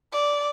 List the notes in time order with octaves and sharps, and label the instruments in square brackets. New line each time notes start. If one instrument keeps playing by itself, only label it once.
[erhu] D5